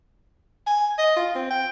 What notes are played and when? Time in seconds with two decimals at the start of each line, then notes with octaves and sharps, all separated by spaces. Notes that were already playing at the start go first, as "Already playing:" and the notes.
0.67 G#5
0.98 D#5
1.16 F4
1.35 C4
1.51 G5